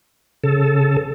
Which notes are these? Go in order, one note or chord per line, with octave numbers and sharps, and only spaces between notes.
C#3 A4